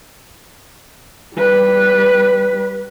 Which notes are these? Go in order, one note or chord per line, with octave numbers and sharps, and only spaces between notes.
G3 B4